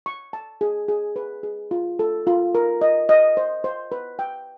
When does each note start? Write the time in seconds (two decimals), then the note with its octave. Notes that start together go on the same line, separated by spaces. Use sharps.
0.06 C#6
0.33 A5
0.61 G#4
0.88 G#4
1.16 B4
1.43 G#4
1.71 F4
1.99 A4
2.27 F4
2.55 A#4
2.81 D#5
3.09 D#5
3.37 C5
3.64 C5
3.92 B4
4.19 G5